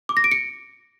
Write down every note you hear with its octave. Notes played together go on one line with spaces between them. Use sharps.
D6
A#6
D7
C#7